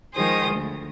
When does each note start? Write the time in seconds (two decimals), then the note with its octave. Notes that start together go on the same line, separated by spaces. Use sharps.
0.14 D#3 F3 G#3 G#4 C5 D#6
0.51 D2